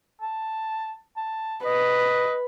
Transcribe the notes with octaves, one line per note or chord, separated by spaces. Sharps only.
A5
A5
B4 D#5